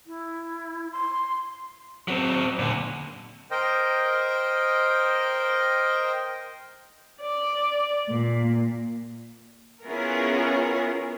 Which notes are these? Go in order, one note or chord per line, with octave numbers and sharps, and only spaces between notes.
E4
C6
F#3 C4
A#2 D3
A#4 C5 D#5 G5
D5
A#2
B3 C#4 E4 F4 G#4 A#4